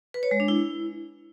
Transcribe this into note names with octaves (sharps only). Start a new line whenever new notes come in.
B4
C#5
G#3
D4
E4